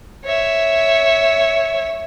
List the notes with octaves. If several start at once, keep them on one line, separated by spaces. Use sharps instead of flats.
C#5 E5